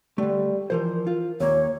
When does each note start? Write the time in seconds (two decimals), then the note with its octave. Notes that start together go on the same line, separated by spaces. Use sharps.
0.18 D3 G3 A3
0.70 E3 F3 A#4 C5
1.07 F4 A#4
1.40 D#2 A#2 A#3 C#5